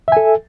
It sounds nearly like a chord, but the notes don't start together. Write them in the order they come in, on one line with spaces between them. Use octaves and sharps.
E5 G#5 A4